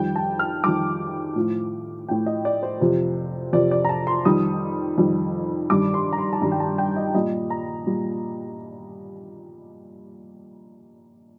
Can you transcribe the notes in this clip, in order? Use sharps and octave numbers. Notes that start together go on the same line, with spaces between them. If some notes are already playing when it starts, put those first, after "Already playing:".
Already playing: F2 D#3 G3 G5
A5
F6
F2 D#3 G3 D6
A2 F3
A2 F3 G5
D#5
D5
C5
F2 C3 F3
F2 C3 F3 D5
D5
A#5
A5
C6
F2 D#3 G3 D#6
F2 D#3 G3
G2 D#3 G3 D6
C6
A#5
C6
A5
G2 D#3 G3 A#5
G5
A5
G5
D#5
A#2 G3 D#5
A#5
A#2 G3